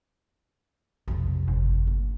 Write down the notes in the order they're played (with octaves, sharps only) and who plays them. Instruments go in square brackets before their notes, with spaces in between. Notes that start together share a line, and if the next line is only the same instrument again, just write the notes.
[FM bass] B1 [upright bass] F2 C3
[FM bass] G1
[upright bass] A#2